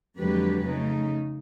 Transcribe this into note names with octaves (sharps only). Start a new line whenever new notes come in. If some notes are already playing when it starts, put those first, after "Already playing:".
F2 D3 F#3 G#3 G4 B4
C#3 A3 D#4